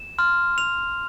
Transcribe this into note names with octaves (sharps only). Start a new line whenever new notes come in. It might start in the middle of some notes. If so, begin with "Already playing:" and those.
Already playing: E7
C6 F6
F7